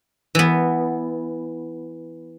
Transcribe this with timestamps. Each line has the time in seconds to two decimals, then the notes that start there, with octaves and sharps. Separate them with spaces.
0.35 E3 B3